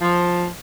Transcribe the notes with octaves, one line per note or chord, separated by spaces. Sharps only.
F3